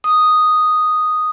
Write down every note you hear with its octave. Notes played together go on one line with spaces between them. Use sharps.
D#6